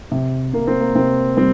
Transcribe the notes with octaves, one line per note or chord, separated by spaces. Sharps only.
C3
C3 A#3
C4
A#3
C3 C4
G3 C4